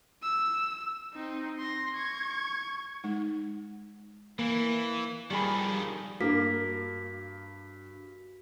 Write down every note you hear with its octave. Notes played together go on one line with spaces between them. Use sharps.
E6
C4 D#4
C6 A#6
C#6 G#6
G#3 D#4
E3 A#3
F2 D#3 G3 G#4 B5
G2 A#3 F#4 B6